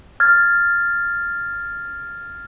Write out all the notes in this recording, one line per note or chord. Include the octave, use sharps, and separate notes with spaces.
F6 G#6 A6